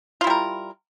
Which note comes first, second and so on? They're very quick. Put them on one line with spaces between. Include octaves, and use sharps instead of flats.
F4 E4 G3 A#4